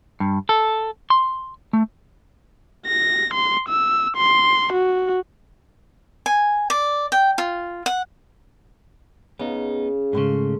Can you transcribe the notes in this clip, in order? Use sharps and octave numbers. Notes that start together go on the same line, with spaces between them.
G2
A4
C6
A3
A#6
C6
E6
C6
F#4
G#5
D5
G5
F4
F#5
C#3 B3 D#4
G#2 C#3 A3 C6 C#6